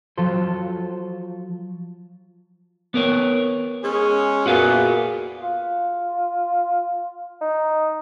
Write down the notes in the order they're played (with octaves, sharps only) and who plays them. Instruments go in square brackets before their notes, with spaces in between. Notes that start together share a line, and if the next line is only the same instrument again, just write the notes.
[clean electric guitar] F3 F#3 F4 A4 C5
B3 A#4 C#5
[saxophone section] G#3 C#4 G#4
[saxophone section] A#2 B3 [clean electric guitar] F#4 G#4 F5
[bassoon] F4
D#4